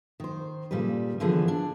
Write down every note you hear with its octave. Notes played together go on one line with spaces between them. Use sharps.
D#3 C5
A#2 C#3 G3 A4 B4
D3 E3 F3 B3 G#4
D4